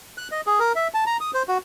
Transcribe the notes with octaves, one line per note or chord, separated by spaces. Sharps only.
F#6
D#5
G#4
A#4
E5
A5
A#5
D#6
C5
F#4